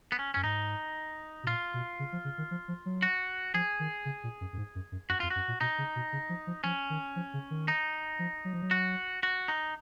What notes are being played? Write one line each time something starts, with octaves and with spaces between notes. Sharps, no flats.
B3
C#4
F#2 C#4
G#2 D#4
B2
A#2 F4
B2
C#3
F3
C#3
D#3
F3
F3
F#3
F#4
F3 G#4
D#3
C#3
A#2
F#2
F#2
G#2
F#2
F#2
F#2 F#4
F2 F4
F#4
F#2
A#2
B2 D#4
C#3
B2
C#3
F3
F3
F3 C#4
D#3
F3
C#3
D#3
D#4
F3
F#3
F3
F#3
F#4
F#4
D#4